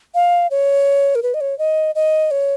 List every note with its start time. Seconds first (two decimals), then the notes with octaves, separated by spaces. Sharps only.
0.14 F5
0.51 C#5
1.15 A#4
1.23 B4
1.34 D#5
1.41 C#5
1.59 D#5
1.95 D#5
2.31 C#5